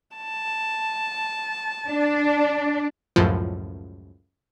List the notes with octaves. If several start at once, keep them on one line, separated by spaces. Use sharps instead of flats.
A5
D4
C#2 F#2 A2 F3